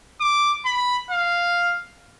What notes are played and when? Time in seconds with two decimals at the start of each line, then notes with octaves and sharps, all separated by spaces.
0.21 D6
0.66 B5
1.11 F5